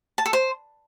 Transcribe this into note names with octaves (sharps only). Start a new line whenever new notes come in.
A5
A4
C5